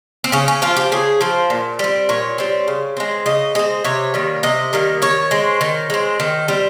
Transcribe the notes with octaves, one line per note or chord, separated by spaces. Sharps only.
C4
C#3 C#4
C#4
F3 C4 F4
G4
C#3 G#4
F3 C4
A#2
G3 C4
A#2 C#5
G3 C4
C#3
G#3 C4
C#3 D#5
G#3 C4 D#5
C3 C#5
D#3 G3 A#3
C3 D#5
D#3 G3 A#3
D#3 C#5
G#3 C4
D#3
G#3 C4
D#3
G3 C4